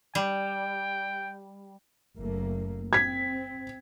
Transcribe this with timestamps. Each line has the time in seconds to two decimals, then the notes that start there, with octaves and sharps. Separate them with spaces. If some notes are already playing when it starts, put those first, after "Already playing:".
0.15 G3 G5
2.18 F#1 A3 A#3
2.93 C4 G#6 B6